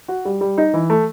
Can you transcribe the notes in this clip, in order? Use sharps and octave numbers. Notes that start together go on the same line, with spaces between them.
F#4
G3
G3
D#4
E3
A3